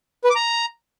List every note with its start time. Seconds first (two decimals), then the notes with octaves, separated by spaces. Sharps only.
0.24 B4
0.30 D6
0.36 A#5